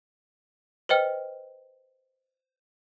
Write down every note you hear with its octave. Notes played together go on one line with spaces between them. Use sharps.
B4 C5 D#5 G5 F6